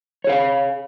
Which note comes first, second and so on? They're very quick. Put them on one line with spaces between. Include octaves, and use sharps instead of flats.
C#5 G#4 F5